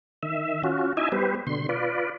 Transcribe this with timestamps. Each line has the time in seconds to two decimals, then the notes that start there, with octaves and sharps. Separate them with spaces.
0.23 D#3 E5
0.64 C#4 F4 F#4
0.97 D#4 E4 D#5 E5 G#5
1.12 G3 B3 G4 B4 C5
1.47 B2 D3 C6
1.69 F4 B4 D5